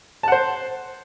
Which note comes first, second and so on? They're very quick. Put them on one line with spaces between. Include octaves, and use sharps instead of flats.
A5 F#5 C5